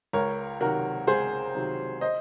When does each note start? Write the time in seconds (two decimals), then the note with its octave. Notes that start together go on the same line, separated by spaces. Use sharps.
0.13 C#2 A#4 C#5
0.60 C3 D#3 F#3 F#4 A#4
1.07 C#2 G#4 C5
1.55 C3 D#3 F#3
2.01 C5 D#5